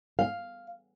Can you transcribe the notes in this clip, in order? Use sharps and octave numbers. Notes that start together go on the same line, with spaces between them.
F5